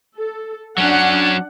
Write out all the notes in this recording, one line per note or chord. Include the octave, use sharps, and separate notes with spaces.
A4
F#3 C#4 D4 F#5